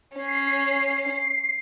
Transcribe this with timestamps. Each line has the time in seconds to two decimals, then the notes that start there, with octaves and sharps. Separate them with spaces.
0.17 C#4 C7